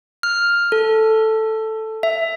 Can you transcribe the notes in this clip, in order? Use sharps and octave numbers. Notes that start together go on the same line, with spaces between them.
F6
A4
E5